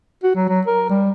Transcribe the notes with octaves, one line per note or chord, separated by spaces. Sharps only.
F#4
F#3
F#3
A#4
G3